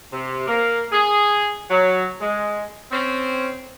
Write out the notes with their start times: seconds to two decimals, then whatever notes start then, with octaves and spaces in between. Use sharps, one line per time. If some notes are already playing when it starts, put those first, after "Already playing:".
0.13 C3
0.48 A#3
0.92 G#4
1.70 F#3
2.21 G#3
2.92 C4 C#4